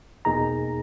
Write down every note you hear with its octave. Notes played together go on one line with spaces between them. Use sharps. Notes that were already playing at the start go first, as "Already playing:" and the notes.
E2 B2 A#3 D#4 G#4 A#5